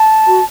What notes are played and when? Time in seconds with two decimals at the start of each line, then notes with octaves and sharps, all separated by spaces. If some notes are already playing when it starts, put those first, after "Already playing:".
Already playing: A5
0.25 F#4